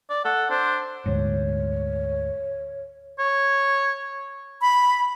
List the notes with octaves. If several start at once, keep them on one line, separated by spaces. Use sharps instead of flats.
D5
A4 F#5
D4 C5
D2 G#2 C#5
C#5
B5